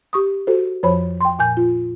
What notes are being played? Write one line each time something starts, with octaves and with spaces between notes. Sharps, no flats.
G4 C#6 D#6
F#4 A4 C5
F2 F3 C5 C#5 B5
G5 C6
A#2 G#5 G6
F4